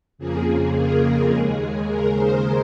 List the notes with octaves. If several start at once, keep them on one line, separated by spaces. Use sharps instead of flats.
F2 C#3 F3 A#3 G#4
G#4
A#4
D#2 C#3 G#3 G#4
A#4
C5